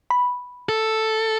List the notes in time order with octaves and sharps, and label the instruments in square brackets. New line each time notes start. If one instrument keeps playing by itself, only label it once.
[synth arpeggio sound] B5
[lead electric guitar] A4